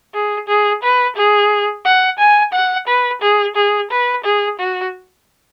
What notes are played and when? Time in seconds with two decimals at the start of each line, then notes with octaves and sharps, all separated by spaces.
0.14 G#4
0.48 G#4
0.83 B4
1.16 G#4
1.85 F#5
2.19 G#5
2.53 F#5
2.87 B4
3.22 G#4
3.56 G#4
3.91 B4
4.24 G#4
4.59 F#4